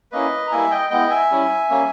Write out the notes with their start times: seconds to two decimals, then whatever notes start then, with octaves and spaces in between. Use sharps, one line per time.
0.12 A#3 C#4 E4 B4 D#5
0.47 A#5
0.51 G3 A#3 E4 E5 G#5
0.71 D#5 G5
0.90 G#3 B3 E4 D#5 G5
1.10 E5 G#5
1.30 G3 C#4 E4
1.70 G3 A#3 C#4